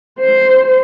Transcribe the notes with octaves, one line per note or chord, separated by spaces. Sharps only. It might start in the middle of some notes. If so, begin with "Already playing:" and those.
C5